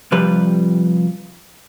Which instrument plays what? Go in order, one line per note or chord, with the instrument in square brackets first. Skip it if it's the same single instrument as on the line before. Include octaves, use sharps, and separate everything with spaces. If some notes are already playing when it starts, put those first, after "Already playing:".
[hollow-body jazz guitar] C3 F3 G3 B4